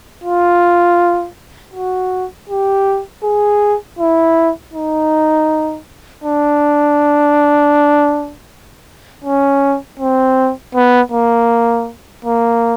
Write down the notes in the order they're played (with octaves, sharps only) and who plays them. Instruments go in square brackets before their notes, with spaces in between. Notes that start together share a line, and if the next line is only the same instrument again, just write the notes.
[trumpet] F4
F#4
G4
G#4
E4
D#4
D4
C#4
C4
B3
A#3
A#3